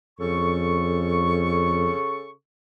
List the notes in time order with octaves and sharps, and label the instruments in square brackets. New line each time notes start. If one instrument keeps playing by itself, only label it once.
[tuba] F2 [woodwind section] C#3 A4 C#6